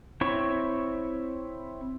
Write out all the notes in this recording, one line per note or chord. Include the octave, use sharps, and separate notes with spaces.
C4 E4 C#5 C#6